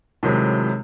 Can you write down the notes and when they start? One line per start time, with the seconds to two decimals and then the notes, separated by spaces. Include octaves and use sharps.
0.23 A2 C3 D#3 F#3 G#3